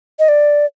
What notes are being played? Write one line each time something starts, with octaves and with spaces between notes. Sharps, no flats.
D#5
D5